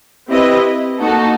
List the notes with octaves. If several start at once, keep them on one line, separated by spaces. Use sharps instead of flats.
C4 E4 G4 B4 D#5
A#3 D#4 F#4 A4